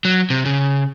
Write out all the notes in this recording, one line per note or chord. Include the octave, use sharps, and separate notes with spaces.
F#3
C3
C#3